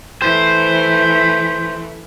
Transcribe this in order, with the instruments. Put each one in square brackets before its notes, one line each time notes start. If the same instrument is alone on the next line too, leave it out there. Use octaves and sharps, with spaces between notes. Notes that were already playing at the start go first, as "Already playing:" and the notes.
[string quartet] E3 A3 [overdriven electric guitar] C5